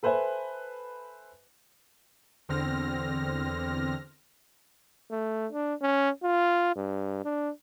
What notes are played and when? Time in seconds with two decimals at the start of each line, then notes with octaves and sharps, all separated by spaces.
0.03 A4 B4 C5 E5 G#5
2.49 E2 D3 C4 F6 A#6
5.11 A3
5.52 D4
5.82 C#4
6.23 F4
6.76 G2
7.25 D4